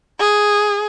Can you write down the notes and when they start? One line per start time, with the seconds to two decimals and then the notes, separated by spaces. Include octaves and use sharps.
0.20 G#4